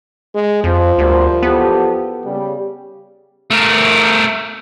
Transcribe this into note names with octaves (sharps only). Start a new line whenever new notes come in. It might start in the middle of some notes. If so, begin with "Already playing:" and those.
G#3
F2 F3
D2 G3 A#4 C5
E2 B3 G4 A4
C#3 G3
A3 A#4